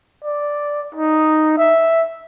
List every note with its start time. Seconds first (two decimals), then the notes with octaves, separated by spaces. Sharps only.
0.24 D5
0.95 D#4
1.58 E5